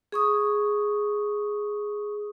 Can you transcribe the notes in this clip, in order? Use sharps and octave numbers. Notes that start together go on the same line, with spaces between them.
G#4 C#6 D#6